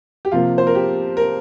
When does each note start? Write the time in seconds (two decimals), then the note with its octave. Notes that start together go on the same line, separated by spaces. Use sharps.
0.25 G4
0.32 C3 F3 A#3 F4
0.58 C5
0.67 A#4
0.75 G4
1.17 A#4